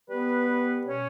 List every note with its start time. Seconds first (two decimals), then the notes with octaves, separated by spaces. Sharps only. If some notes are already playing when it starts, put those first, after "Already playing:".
0.09 G3 B3 B4
0.48 G3
0.87 B2 C#4 C#5